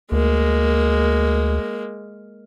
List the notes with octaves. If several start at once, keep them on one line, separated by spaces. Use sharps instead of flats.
D2 G#3 A#3